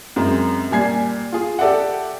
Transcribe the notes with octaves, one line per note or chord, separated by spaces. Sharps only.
F#2 G#3 C4
A#2 G3 G#5 G#6 C7
F4 G#4
G4 A4 D5 E5 F#5